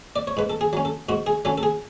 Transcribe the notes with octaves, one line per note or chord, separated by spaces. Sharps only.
D5
C#5
G#2 B4
A4
G#4
F#3 C#4
A4
G#2 F#4
G#4
F#3 C#4 A4
A4
G#4